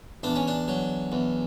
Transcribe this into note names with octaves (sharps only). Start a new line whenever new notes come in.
E2 D4
C#4
D4
F#3
E2